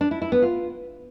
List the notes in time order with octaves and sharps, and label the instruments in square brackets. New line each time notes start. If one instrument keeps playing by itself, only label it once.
[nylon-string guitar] D4
E4
E4
B3
F4